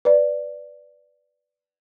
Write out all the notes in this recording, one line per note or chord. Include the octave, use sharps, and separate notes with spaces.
B4 D5